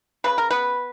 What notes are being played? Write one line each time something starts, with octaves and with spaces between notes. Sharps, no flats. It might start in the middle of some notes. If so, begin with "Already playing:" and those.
C#3 B4
A#4
B3 B4